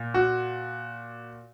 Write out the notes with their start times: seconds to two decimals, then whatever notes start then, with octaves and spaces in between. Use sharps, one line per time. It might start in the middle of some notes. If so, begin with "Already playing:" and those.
Already playing: A#2
0.14 F#4